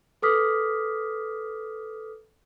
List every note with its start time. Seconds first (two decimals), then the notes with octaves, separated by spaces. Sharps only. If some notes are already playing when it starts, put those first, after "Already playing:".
0.22 A4 B4 D6 D#6 F6 B6